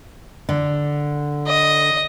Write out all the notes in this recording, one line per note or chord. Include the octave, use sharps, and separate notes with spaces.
D3
D#5